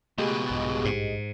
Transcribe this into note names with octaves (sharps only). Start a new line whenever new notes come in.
C#2 B2 A3 G4 G#4 D#5
A#1 G2
G#2